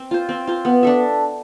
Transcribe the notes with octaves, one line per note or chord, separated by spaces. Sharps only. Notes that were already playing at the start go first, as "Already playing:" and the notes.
Already playing: C4
F4 C5
C4
F4 C5
B3
D4 A4 E5